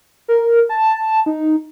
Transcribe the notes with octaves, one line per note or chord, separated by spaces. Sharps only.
A#4
A5
D#4